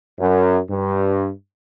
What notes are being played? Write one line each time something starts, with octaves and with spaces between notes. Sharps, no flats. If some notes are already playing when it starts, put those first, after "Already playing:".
F#2
G2